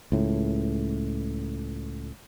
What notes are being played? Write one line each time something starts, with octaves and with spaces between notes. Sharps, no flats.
C#2 A2